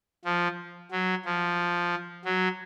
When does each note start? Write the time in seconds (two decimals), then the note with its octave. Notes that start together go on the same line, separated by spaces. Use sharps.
0.25 F3
0.91 F#3
1.25 F3
2.25 F#3